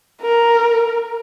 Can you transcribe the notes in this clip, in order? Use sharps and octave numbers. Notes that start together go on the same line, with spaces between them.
A#4